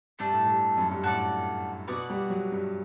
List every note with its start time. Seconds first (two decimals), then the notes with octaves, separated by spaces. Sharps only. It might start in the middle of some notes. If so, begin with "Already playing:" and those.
0.19 G2 A3 D4 A4
0.33 A2
0.47 G2
0.78 F#2
0.91 G2
1.03 A2 F#4 A4 D5
1.88 B2 F#4 B4 D5 F#5
2.10 G3
2.30 F#3
2.52 G2